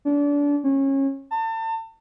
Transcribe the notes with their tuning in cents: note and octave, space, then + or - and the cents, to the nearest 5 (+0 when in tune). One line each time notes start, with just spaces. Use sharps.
D4 -30
C#4 -25
A5 +35